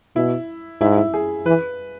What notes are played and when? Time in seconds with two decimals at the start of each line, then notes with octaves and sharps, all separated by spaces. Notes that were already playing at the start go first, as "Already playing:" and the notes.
0.16 B2 E4
0.81 G#2 E4
0.97 E4
1.14 G#4
1.45 E3 B4